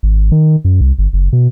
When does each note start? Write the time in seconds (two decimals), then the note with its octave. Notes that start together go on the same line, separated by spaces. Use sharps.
0.03 G#1
0.32 D#3
0.65 F#2
0.81 C2
0.98 G1
1.13 F#1
1.33 B2